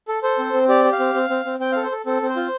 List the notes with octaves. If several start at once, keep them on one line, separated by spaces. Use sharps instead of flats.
A4
A4 C5
C4
C4
G4 D5
G4
F5
C4
C4
C4
C4
C4 G5
A4 F5
C5
A4
C4 A4
C4
C5
F4